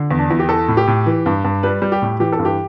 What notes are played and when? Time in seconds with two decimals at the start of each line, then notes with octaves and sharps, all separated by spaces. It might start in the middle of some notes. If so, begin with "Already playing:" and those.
Already playing: D3
0.11 E2
0.19 D4
0.30 E2 E4
0.39 G4
0.49 E3 A4
0.68 A2
0.77 G4
0.87 A2
1.06 E3
1.26 G2
1.44 G2
1.63 G3 B4
1.82 G3
1.92 G4
2.02 A2
2.20 E3 G4
2.32 A4
2.39 G2
2.45 G4